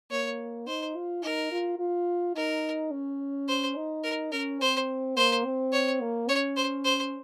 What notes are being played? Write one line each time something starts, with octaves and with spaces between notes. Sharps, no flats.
A#3 C#5
D#4 C5
F4
D#4 A#4
F4
F4
D#4 A#4
C#4
C5
D#4
A#4
C#4 A#4
C4 C5
A#3 C5
C4
C#5
A#3
C#4 C#5
C5
C5